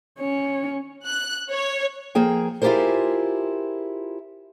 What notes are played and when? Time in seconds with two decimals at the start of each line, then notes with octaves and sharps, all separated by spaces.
0.19 C#4 C#5
1.06 F#6
1.50 C#5
2.15 F3 A#3 G#4 G5
2.62 E4 F4 G4 G#4 A#4 C5